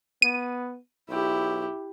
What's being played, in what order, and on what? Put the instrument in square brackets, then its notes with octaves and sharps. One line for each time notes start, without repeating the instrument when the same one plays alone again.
[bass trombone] B3 [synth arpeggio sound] D#7
[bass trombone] B1 [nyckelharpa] E4 G4